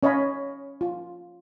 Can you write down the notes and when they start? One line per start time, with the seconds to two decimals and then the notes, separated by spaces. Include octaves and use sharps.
0.03 C#4 C#5 D#5 F5 B5
0.81 F4